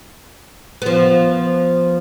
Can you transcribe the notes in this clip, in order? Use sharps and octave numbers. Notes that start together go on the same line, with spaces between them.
F3 B3